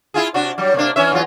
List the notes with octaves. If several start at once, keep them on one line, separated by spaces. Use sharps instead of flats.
E4 F4 G#4
C3 D4 F#4
F#3 G3
C3 A#3 D4
E3 C#4 E5
E2 F#3 F4